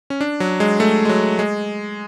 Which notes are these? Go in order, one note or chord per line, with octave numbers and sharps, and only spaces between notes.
C#4
D4
F#3
G#3
A3
G#3
F#3
G#3